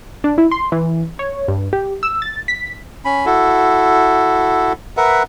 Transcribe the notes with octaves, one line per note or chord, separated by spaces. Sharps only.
D4
E4
C6
E3
C#5
G2
G4
E6
A6
B6
C#4 B5
E4 F#4 A4
A#4 B4 E5 F#5